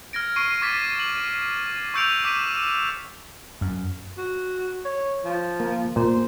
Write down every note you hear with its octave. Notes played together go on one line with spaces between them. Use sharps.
F6 G#6 A#6 D7
C#6 C7 D7 D#7
C#6 D6 G#6 A6 B6 D#7
F#7
C#6 E6 G6 C#7 D7 F7
D6 G6 B6 D#7
F#2
F#4
C#5
F3
A#3
A#2 C5